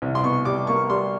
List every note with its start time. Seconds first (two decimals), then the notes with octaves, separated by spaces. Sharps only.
0.02 C2
0.15 C6
0.23 B2 C#6
0.45 G3 D6
0.67 A#3 C#6
0.90 G3 C6